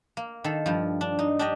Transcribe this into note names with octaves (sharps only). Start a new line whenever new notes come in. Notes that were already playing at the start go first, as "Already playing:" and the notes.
A#3
D#3 A4
G2 F3
D4
D#4
D4 G4 D#5